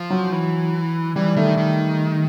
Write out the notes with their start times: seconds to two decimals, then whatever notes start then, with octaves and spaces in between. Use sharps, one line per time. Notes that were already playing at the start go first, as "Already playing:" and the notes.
Already playing: F3
0.10 F#3
0.32 E3
1.16 E3 G3
1.36 D#3 A3
1.58 D#3